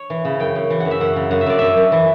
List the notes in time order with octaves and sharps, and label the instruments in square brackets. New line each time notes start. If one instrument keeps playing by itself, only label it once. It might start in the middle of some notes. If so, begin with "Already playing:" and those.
Already playing: [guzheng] C#5
E3
C#3
F#2 G5
F#2
E3
F#2 F#5
E5
F#2 F#5
C#3
F#2 F#5
E5
F#2 D5
F#2 E5
F#2
E3